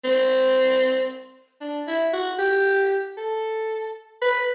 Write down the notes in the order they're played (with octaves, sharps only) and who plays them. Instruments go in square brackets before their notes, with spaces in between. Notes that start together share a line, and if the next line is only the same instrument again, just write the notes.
[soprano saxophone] C4
D4
E4
F#4
G4
A4
B4